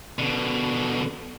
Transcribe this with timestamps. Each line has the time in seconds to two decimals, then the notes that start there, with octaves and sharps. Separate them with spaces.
0.19 B2 D3